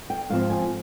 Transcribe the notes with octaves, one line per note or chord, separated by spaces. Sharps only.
G5
G#2 F3 C4 F5
G#5